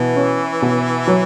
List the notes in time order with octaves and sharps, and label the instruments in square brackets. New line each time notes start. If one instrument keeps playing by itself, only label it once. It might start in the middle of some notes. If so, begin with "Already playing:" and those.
Already playing: [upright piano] B2 [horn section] E3
[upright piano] C#4
B2
F#3